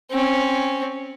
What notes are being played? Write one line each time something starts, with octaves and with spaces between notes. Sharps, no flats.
C4 C#4